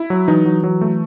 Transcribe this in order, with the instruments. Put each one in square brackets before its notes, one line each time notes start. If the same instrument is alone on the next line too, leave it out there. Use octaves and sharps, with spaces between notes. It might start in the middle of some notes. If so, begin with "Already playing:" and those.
Already playing: [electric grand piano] E4
F#3
[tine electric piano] E3 [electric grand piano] D#4
[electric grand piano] F#3
F#3
A3